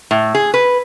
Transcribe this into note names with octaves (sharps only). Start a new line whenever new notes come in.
A2
G#4
B4